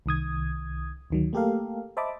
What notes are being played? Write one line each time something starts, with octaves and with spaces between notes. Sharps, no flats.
C2 D#3 D#6 G#6
D2 D#3 F#3
A3 A#3 G4 A4 A#4 F5
C5 D#5 E5 A5 B5 D6